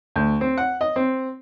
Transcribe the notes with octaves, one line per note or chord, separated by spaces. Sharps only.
D2
C4
F#5
D#5
C4